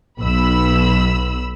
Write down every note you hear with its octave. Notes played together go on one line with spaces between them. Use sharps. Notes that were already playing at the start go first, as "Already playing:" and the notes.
B1 B2 B5 E6